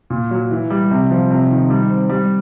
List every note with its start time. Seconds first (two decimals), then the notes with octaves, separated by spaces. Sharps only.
0.10 A#2
0.31 F#3
0.51 E3
0.70 G3
0.91 C3
1.11 F3
1.31 C3
1.50 D#3
1.70 G3
1.90 C4
2.10 G3